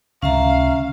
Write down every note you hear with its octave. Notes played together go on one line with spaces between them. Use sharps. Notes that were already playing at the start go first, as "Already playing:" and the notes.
C#2 C3 D#3 C#4 E5 F5 A#5